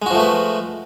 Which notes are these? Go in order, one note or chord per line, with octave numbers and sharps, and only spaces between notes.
F3 G#3 A3 F#4 B4